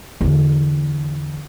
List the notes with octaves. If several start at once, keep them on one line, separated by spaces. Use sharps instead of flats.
E2 D3